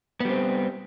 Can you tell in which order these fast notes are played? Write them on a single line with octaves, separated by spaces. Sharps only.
B3 G3 C4